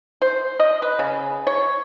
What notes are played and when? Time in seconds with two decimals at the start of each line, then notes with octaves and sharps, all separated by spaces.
0.22 C5
0.60 D#5
0.82 B4
0.99 C#3
1.47 C#5